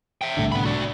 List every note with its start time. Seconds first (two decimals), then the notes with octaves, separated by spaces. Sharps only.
0.21 E5 G5
0.37 C2 A2 D3
0.52 B3 B5
0.65 F#4 D5